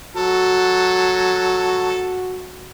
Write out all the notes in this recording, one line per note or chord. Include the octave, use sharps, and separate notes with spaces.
F#3 F#4 A4